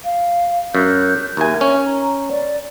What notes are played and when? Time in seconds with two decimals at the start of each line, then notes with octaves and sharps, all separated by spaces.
0.02 F5
0.75 F#2 F#6 G6
1.37 D#2 A#4 E5 G#5
1.61 C#4
1.83 A#5
2.28 D5